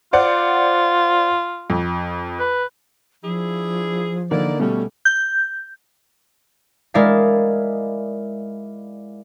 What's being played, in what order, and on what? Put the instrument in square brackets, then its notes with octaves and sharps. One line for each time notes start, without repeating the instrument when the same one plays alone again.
[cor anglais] F4 [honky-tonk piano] C5 D5 F#5
[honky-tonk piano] F2
[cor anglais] B4
[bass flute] F3 [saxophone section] D4 E4 G#4
[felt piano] D3 A#3 D#4 [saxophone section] E4 A#4 D5
[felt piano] B2 G3 A3 [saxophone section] C#4 [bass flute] A4
[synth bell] G6
[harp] G#3 E4 A#4 D5 E5 F5